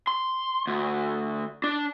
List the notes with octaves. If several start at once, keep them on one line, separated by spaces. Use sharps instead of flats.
C6
D2
D4